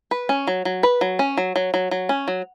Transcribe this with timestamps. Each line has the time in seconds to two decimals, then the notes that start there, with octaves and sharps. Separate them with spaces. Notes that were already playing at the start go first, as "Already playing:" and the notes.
0.11 B4
0.29 C#4
0.47 F#3
0.65 F#3
0.83 B4
1.01 F#3
1.19 C#4
1.37 F#3
1.56 F#3
1.74 F#3
1.91 F#3
2.09 C#4
2.28 F#3